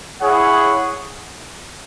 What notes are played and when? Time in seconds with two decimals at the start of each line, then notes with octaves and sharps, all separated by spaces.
0.20 E4 G#4 C#5 F#5